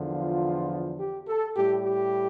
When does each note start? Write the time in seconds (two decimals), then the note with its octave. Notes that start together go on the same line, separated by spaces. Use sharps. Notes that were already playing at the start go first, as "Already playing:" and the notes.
Already playing: E2 D3 F3
0.14 F4
0.99 G4
1.28 A4
1.56 A2 G3 G4
1.86 G4